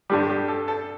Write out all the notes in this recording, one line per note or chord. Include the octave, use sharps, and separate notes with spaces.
G2 D3 G3 G4
G4
A4
A4